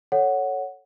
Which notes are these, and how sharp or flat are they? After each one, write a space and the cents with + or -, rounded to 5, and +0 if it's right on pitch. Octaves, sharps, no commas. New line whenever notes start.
A4 +0 C#5 +0 F#5 +0